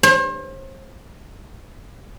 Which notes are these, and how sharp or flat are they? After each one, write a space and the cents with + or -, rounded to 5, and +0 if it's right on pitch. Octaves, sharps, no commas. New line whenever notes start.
C5 +40